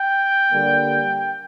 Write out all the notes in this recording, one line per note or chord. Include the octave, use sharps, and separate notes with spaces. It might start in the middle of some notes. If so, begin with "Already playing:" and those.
Already playing: G5
D3 G3 A#3